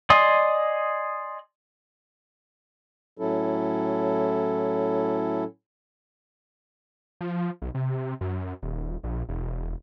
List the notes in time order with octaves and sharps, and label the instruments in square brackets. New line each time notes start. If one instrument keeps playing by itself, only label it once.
[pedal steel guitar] D5 D#5 G#5 C6 D#6
[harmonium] A2 F#3 C#4 E4 A4
[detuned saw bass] F3
B1
C3
F#2
D#1
A#1
E1